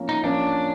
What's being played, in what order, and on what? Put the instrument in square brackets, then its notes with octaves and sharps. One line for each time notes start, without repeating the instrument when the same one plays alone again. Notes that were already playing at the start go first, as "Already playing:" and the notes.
Already playing: [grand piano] F3 A#3 C#4
[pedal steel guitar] D#4
[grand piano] F3 A#3 C#4 [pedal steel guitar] D4